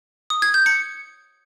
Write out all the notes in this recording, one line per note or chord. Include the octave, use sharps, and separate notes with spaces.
D#6
G#6
G6
C#7